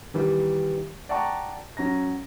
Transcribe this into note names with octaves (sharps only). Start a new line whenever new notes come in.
D#3 E3 G3
D5 F#5 G5 A5 A#5 C#6
F#3 C#4 A#5 A#6